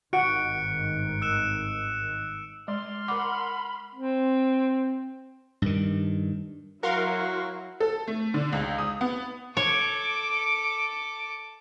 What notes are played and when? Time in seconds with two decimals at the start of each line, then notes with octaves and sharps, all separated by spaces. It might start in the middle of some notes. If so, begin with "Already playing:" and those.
0.13 G#1 G2 D#3 F#4 F#5 F#6 C#7 D7
1.22 E6 F#6 E7
2.68 G#3 D5 C6 F6
3.08 A#4 F#5 B5 D6
3.95 C4
5.62 G2 D#3
6.83 F#3 E4 F#4 A#4 F5 C6
7.80 A4
8.07 A3
8.34 D3
8.53 C#2
8.78 D#6
9.01 B3
9.57 A4 C#5 D6